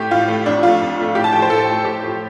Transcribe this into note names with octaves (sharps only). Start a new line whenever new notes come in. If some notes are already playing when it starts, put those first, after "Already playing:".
Already playing: A2 A3 G4
A2 F4
A3
F2 D4
F3 A3 F4
F2
F3 A3
A2 G4
A5
F3 A3 G5
C5
A2 A4
F3 A3
A2 G4
F3 A3